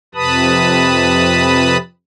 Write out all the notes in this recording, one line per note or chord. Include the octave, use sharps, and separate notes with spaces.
F2 C3 B4 A5 B5 D#6